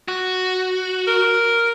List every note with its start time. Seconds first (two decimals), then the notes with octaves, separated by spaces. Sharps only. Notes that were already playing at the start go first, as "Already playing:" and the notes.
0.08 F#4
1.07 A#4